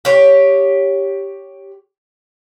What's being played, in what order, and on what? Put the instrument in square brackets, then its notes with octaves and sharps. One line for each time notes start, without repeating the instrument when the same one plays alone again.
[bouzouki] G4 C#5